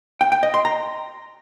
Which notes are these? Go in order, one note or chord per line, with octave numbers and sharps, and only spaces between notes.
G5
G5
D#5
C6
A#5